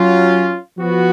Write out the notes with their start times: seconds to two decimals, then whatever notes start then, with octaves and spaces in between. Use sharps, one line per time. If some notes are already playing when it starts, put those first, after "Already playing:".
Already playing: F#3 C#4 F4
0.77 F3 B3 F#4